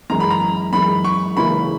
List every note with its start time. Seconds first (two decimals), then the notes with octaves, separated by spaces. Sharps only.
0.10 F#2 E3 G#3 A#5
0.20 B5
0.31 A#5
0.72 F#2 E3 G#3 B5
1.05 C#6
1.36 C#2 C#3 E3 A#3 E4 B5